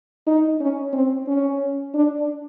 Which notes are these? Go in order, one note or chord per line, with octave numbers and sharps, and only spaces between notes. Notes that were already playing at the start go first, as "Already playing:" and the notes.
D#4
C#4
C4
C#4
D4